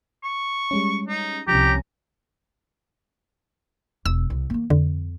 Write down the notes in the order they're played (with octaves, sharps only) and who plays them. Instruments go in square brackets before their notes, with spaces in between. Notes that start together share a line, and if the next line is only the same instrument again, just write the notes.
[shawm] C#6
[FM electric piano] G3 G#3 C#4
[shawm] D#4
[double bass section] C2 C#4 [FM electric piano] F3 [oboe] G4 [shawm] A#5
[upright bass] E1 [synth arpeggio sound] E6
[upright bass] C2
D#3 A#3
[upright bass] F2 [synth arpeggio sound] D3